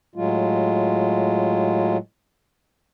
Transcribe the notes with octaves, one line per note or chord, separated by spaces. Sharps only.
A2 F#3 G#3 F4